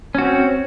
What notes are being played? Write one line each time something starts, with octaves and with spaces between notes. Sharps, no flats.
C4 C#4 F#4